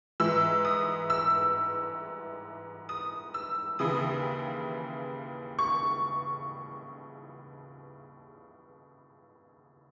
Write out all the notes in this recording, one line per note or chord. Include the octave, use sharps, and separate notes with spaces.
G#2 E3 E6
D#6
E6
D#6
E6
D#2 C#3 E3 D#6
C#6